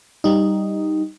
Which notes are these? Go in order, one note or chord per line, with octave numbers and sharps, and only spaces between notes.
G3 D#4